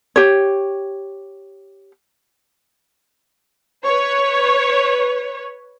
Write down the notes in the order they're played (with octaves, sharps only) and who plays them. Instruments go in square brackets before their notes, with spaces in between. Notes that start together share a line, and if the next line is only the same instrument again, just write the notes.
[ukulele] G4 C#5
[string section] B4 C#5